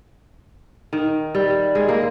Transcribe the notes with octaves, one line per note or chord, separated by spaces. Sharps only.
D#3
G3
G#3
A#3